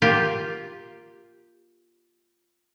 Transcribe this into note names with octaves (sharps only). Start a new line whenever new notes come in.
A#3 F4 G4